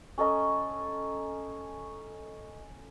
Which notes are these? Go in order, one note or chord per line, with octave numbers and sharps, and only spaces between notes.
C#4 A4 D#5 A#5